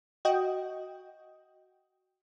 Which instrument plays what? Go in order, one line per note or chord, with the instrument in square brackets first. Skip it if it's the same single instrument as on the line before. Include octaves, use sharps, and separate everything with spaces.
[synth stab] F#4 D#5 G5